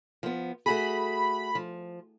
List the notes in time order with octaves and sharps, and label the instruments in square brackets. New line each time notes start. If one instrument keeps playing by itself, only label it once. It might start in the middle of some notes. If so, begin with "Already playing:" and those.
[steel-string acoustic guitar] F3 B3
[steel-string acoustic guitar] A3 F#4 G#4 [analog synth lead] B5
[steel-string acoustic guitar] F3